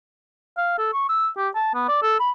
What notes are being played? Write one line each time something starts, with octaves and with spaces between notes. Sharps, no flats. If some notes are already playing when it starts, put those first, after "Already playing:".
F5
A4
C#6
E6
G4
A5
B3
D5
A4
B5